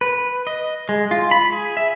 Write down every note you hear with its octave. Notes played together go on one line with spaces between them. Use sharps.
B4
D#5
G#3
F4
B5
G#4
E5